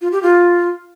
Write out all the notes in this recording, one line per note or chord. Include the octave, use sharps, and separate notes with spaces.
F4
G4
F4